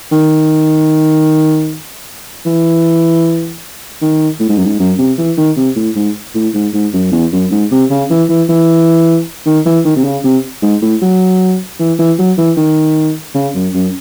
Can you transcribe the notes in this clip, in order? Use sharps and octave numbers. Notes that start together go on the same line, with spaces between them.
D#3
E3
D#3
A2
G#2
F#2
G#2
F#2
C3
E3
D#3
C3
A2
G#2
A2
G#2
G#2
F#2
E2
F#2
G#2
C3
C#3
E3
E3
E3
D#3
E3
D#3
C3
C#3
C3
G#2
A2
F#3
E3
E3
F#3
E3
D#3
C#3
F#2
F#2